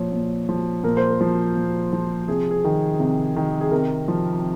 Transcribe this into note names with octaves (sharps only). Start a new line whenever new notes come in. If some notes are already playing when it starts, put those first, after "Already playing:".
Already playing: A#2 F3 C#5
A#2
F3
A#2 A#4
C5
A#4
F3
A#2
F3
C3 G#4
G#4
D#3
C3
D#3
G#4
C3 A#4
F3